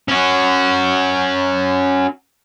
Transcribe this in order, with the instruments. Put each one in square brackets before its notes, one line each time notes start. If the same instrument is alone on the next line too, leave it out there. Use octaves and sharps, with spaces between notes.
[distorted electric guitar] C#4 F#4